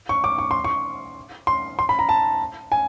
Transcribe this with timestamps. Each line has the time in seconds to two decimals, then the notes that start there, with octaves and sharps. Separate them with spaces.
0.09 C#6
0.24 D6
0.38 C#6
0.51 C6
0.64 C#6
1.47 C6
1.79 C6
1.89 B5
1.99 A#5
2.09 A5
2.72 G#5